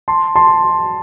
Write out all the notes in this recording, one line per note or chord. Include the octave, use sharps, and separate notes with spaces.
A5 C6
A5 C6